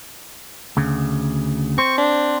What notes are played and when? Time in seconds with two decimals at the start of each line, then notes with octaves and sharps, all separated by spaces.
0.77 D2 C#3
1.78 C4 C5 C#6
1.98 D4